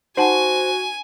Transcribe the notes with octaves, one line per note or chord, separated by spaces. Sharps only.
D#4 F#4 C5 F#5 G#5 A5